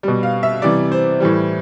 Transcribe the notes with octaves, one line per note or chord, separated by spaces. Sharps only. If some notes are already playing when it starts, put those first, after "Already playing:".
B2 G3
F5
E5
C3 E3 G3 D5
C5
A2 E3 G3